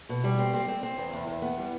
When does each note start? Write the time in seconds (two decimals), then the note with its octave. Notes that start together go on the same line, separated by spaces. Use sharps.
0.09 B2
0.24 G3
0.39 C4
0.53 C4
0.68 C4
0.83 C4
0.98 E2
1.13 E2
1.27 E2
1.42 B3
1.58 G3